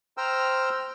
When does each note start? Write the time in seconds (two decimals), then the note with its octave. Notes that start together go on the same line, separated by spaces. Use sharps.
0.17 C5 G5 A#5 E6 F6